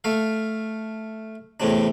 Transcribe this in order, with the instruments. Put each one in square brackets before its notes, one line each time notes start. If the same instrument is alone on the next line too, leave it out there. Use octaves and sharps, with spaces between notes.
[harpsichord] A3 F5
E2 A2 C3 D4